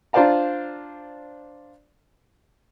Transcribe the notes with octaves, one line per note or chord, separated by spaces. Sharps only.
D4 F4 C5 D5 F5 A#5